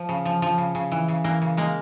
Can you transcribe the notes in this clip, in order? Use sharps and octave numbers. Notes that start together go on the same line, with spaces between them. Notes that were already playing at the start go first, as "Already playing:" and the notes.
Already playing: F3
C#3
F3
F3
C#3
C#3
E3
C#3
E3 A#3
C#3
G#3 A#3